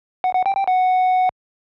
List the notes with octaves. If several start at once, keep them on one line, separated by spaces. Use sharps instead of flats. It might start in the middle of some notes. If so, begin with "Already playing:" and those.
F#5
F#5
G5
G5
F#5